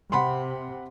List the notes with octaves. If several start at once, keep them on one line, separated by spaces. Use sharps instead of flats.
C3 F#5 B5 C6